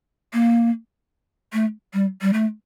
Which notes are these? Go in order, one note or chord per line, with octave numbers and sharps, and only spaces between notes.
A#3
A3
G3
G3
A3